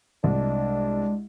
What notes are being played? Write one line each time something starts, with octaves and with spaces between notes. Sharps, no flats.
C2 G#3 D4